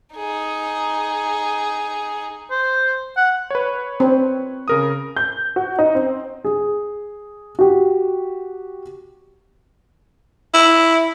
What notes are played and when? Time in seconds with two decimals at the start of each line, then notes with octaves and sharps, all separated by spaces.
0.16 D#4 G#4
2.51 C5
3.17 F#5
3.50 B4 C#5
4.00 C4
4.68 C#3 A#4 D#6
5.16 G6
5.56 F#4
5.79 D#4
5.95 C4
6.45 G#4
7.59 F#4 G4
10.54 E4